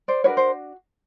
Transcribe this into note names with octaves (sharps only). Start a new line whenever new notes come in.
C5 D5
D4 F#4 A#4 B4 C#5
C5